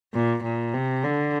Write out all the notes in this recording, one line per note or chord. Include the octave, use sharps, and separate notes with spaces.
A#2
A#2
C3
D3